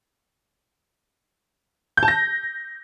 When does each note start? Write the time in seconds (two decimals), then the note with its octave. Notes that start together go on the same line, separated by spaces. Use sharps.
1.97 G6
2.03 A5
2.08 A#6